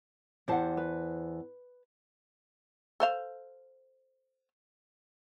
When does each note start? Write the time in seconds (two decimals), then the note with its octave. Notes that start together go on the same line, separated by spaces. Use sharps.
0.48 E2 G4 C5 F#5 A5
0.77 B4
3.00 A4 C5 F5